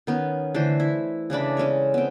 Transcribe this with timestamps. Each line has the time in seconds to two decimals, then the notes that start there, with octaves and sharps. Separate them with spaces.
0.07 D#3 B3 C#4
0.54 D3 E3 A3 C5
0.80 E4
1.30 C#3 E3 D4 B5
1.57 G#3 C#4 A4 C#5
1.94 B3 C4